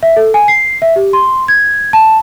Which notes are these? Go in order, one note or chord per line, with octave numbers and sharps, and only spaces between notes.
E5
A4
G#5
C7
E5
G4
C6
G#6
A5